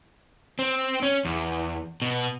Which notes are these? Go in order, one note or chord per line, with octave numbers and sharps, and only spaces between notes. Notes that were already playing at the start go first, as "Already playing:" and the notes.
C4
C#4
E2
B2